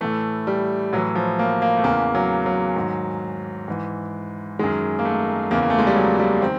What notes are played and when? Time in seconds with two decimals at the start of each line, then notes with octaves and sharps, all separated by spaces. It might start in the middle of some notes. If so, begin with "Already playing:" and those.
0.01 A2 E3 A3
0.47 G3
0.93 A2 E3 F#3
1.15 F3
1.39 A#3
1.62 A#3
1.77 A3
1.84 E2 C#3 E3 A#3
2.15 F#3
2.46 F#3
2.76 G#2 D#3
3.68 G#2 E3
4.59 F#2 D#3 G#3
4.99 A#3
5.05 A3
5.51 E2 C#3 E3 A#3
5.62 A#3
5.70 A3
5.79 G#3
5.87 G3
5.96 F#3
6.20 G3
6.42 D#3 C4